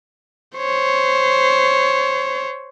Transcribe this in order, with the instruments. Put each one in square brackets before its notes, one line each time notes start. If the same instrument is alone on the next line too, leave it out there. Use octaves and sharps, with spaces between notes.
[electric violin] C5 C#5